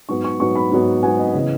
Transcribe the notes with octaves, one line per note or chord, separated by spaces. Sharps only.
G#2 F#3 B3 C#6
C#6
G#2 F#3 B3 C#6
B5
G#2 F#3 B3
G#2 F#3 B3 G#5
D#5
C#3 E3 B3 D#5